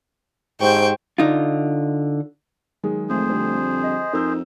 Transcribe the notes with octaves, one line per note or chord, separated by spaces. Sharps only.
G#2 G4 C5 G5 C#6
D3 D#4 F4
D#3 F#3 G#3 G#4
F2 A3 G#4 C5
D3 G3 C4
D#5
F2 D#4 A#4 E6 G6